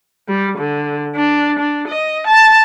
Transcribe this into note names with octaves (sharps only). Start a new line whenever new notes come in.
G3
D3
D4
D4
D#5
A5